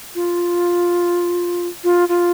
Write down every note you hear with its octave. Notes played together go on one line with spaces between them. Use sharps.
F4
F4
F4